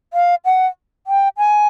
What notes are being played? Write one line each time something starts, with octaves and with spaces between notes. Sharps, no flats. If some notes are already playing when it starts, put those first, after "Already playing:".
F5
F#5
G5
G#5